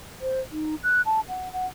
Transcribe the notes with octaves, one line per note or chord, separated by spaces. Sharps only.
C5
D#4
F#6
A5
F#5
F#5